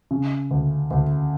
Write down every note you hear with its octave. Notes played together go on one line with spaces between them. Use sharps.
C#3
D2
D2